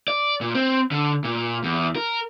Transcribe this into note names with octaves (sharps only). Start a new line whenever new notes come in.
D5
A#2
C4
D3
A#2
E2
A#4